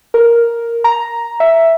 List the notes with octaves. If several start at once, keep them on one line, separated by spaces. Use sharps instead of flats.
A#4
A#5
E5